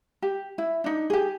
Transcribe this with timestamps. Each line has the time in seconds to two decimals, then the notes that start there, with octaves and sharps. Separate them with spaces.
0.22 G4
0.58 E4
0.84 D4 D#4
1.10 G4 G#4